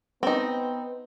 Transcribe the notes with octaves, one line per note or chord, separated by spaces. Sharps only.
B3 C4 D#4